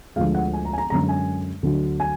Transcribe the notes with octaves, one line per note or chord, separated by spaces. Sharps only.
D2 D3 F3 G#3 F5
F#5
G#5
A#5
G#5
A#5
F#2 D3 G#3 A#5
G#5
D2 D3 F#3
G#5